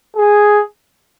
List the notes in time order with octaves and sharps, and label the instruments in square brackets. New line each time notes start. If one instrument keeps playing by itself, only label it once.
[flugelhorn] G#4